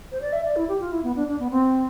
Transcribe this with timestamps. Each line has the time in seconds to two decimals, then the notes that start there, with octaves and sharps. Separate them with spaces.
0.12 C5
0.21 D5
0.33 E5
0.45 D5
0.56 E4
0.69 G4
0.81 F4
0.92 E4
1.04 B3
1.16 D4
1.28 D4
1.40 B3
1.51 C4